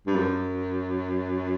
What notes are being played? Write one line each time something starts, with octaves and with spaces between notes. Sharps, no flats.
G2
F#2